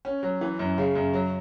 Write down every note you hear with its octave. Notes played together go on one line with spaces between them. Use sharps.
C#4
F#3
E3
F#2
C#3
F#2
F#3